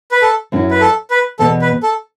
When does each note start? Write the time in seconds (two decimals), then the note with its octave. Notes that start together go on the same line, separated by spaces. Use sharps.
0.11 B4
0.22 A4
0.52 F#2 F#3 C#4 E4
0.71 B4
0.81 A4
1.11 B4
1.39 E2 B2 B3 A4
1.61 B4
1.83 A4